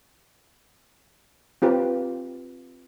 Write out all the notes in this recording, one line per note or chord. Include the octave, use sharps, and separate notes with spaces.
C4 F4 G4 B4